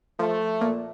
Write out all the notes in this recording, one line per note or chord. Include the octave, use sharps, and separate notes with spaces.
F3 A3
A#2